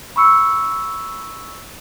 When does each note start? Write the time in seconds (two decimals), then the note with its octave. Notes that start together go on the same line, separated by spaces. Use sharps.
0.16 B5 C#6 E6 C#7